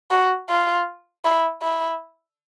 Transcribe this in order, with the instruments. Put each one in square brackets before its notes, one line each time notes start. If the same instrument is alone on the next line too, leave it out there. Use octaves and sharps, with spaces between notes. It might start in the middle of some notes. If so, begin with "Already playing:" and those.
[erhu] F#4
F4
E4
E4